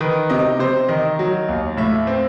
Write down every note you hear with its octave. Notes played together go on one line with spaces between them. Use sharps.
D#3 B4
C3 D#5
C3 C5
D#3 D#5
F#3
D#2
A2 E5
C4